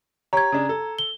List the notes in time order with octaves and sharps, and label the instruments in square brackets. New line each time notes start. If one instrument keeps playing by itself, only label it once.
[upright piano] G4 C#5 [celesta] A#5 G#6
[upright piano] C#3 D4
A4
[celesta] G7